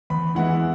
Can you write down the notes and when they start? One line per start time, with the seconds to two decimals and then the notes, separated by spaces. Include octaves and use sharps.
0.10 E2 B5
0.35 E3 G#3 B3 E4 F#5